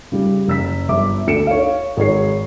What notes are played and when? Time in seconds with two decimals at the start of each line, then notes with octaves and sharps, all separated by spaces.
0.12 C#3 G3
0.47 F#1 E6 B6
0.88 G1 E5 D6
1.27 D2 A4 C#7 D7 E7
1.47 C#5 F5
1.97 G#1 G#4 C#5 C7